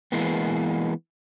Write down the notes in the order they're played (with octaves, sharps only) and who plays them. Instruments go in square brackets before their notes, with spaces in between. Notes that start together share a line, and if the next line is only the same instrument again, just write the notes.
[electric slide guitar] E3 G#3 A#3 B3